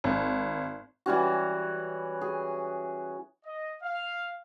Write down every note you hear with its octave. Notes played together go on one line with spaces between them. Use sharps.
G#1
E3 G3 C#4 F#4
G#4
D#5
F5